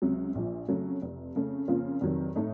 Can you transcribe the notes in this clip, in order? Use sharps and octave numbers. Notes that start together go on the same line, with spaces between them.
C#2 C3 F#3
A#1 A#2 F3
F2 C#3 F#3 A3
F1 F2 C3
F2 C#3 A3
F2 C#3 F3 A#3 F4
F1 F2 D#3 F#3
A2 A3 D#4